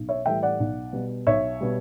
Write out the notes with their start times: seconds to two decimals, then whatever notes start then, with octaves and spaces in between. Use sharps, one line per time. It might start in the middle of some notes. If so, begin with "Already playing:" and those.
Already playing: B1
0.09 C#5 E5
0.26 A2 E3 G3 E5 G5
0.43 D5 F#5
0.60 B1
0.93 B2 G3
1.27 B1 C#5 E5
1.61 B2 G3